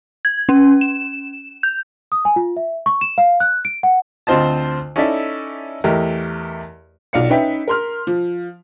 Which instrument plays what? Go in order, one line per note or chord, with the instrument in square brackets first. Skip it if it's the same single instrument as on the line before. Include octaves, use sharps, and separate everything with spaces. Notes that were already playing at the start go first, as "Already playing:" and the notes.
[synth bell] G#6
C#4
E7
G6
[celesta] D#6
G#5
F4
E5
C#6
E7
F5
F#6
D7
F#5
[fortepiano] D2 C4 F4 C5 D#5 A5
C#4 D#4 E4 A4 D5 E5
E2 A3 G4 A#4 D#5
[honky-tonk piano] B1 F4 D5 F5 C#7
C#4 D#4 B4 E5 G5 B6
A#4 C6 F6
F3